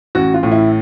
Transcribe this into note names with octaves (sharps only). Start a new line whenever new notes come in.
A1 F#4
F4
A2
E4